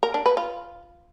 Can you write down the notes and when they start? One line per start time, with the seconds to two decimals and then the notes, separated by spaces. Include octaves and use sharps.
0.03 A#4
0.14 D4
0.26 B4
0.37 F4